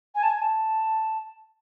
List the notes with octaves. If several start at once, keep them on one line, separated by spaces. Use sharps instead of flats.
G#5
A5
G#5
A5